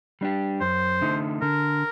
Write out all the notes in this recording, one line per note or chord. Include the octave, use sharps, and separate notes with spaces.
G3 D4 G4
F#2 C5
D3 A3 D#4
D3 A#4